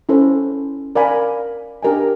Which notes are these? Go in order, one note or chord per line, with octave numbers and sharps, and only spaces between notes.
C#4 E4 A4 C5
A#4 D5 F5 G#5 B5
D4 G4 A#4 D#5 G#5